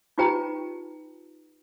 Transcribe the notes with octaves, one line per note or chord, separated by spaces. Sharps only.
D#4 F4 G4 B4 G5 A#5